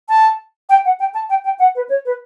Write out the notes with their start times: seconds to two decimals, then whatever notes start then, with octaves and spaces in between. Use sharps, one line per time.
0.09 A5
0.69 G5
0.85 F#5
0.99 G5
1.14 A5
1.30 G5
1.45 G5
1.59 F#5
1.75 B4
1.89 C#5
2.05 B4